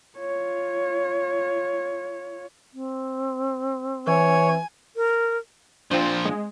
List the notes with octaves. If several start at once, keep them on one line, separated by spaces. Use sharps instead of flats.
F4 C#5
C4
E3 C#5 G#5
A#4
A#2 F3 C4 D4 F4 C5
G#3